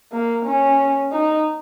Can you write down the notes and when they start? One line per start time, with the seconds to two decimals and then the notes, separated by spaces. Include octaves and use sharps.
0.12 A#3
0.45 C#4
1.12 D#4